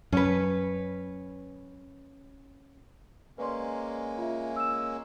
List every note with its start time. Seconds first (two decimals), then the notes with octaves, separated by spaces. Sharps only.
0.12 F#2 C#4 B4
3.38 G#3 A#3 C#4 B4 D5 C6
4.18 F4 E5
4.56 E6 E7